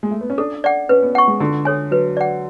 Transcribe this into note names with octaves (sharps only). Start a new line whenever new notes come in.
G#3
A3
B3
C#4
D4 A4
D5 F#5
C#4 B4
B3
F#5 C#6
G#3
D3 F#4
A4 C#5 G#5
F#3 B4
D5 F#5